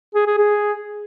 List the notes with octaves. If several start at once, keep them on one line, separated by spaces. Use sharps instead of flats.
G#4
G#4
G#4